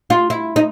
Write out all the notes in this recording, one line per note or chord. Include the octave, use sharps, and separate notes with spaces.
F4
E4
D#4